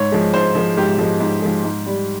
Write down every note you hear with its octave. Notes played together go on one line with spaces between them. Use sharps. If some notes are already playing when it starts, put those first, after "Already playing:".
Already playing: G#2 C#5
F3 G#3
G#2 C5
F3 G#3
G#2 G4
F3 G#3
G#2
F3 G#3
G#2
G3